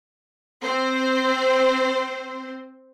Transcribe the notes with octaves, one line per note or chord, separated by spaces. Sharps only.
C4 C5